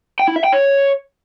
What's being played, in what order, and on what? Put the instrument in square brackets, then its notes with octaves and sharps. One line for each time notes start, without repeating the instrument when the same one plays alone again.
[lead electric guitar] G5
E4
E5
G5
C#5